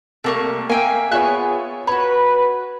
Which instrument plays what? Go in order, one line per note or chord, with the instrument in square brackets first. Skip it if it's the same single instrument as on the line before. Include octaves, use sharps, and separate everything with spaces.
[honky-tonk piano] C2 [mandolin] A3 A#3 C#6
[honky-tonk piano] A#3 [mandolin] E5 G5 G#5
[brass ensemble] B3 G#4 [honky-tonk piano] F4 C#5 [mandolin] E5 G#5 F#6
[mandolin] F#4 C#5 [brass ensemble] B4 [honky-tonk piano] B5